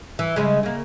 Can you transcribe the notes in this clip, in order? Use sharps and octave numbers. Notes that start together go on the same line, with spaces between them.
E3
C#3 G#3
C#3 A#3